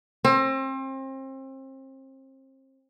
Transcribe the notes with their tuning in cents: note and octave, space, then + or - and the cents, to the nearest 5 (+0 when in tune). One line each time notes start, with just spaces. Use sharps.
C4 +35